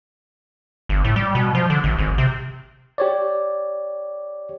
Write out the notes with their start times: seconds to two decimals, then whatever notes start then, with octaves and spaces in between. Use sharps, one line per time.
0.89 G1
1.04 A2
1.16 G3
1.35 B2
1.55 F3
1.70 D3
1.84 A1
1.99 G#1
2.18 C3
2.98 G4 C#5 D5